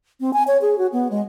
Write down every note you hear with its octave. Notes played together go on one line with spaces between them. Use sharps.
C4
G#5
C#5
G#4
F#4
B3
G#3